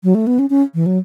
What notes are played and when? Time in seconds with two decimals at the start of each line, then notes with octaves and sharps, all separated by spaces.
0.04 F#3
0.15 A3
0.27 B3
0.39 C#4
0.50 C#4
0.74 E3
0.86 F#3